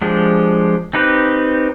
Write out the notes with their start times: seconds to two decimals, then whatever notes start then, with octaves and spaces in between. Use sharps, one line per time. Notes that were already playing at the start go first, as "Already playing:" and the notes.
0.02 F3 G#3 D4 G4
0.93 C4 D#4 G4 B4